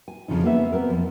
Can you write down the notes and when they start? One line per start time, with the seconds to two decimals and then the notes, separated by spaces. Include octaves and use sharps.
0.08 G#5
0.28 F2 C#3 F3 D#4
0.44 A#3 B3 E5
0.72 B3 C4 A#4
0.90 F2